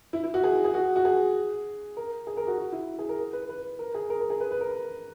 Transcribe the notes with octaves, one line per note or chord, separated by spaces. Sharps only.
E4
E4
F#4
G#4
G#4
F#4
F#4
G#4
A#4
G#4
A#4
F#4
F#4
E4
G#4
A#4
B4
B4
A#4
G#4
A#4
A#4
G#4
B4
B4
A#4
A#4